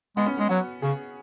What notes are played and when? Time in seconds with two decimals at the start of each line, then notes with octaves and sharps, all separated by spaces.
0.17 G#3 B3
0.26 C#4
0.37 G#3 B3
0.49 F#3 F#4
0.82 C#3 G#4